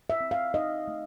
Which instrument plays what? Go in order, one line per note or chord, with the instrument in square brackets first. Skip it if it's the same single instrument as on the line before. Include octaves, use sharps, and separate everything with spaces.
[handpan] E5
C4
F5
D#4 D#5
A3